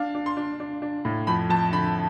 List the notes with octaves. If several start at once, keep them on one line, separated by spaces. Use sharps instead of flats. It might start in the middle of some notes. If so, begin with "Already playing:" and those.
Already playing: D4 F5
D4
C6
D4
D4
D4
A2
F2 B5
F2 A5
D3 B5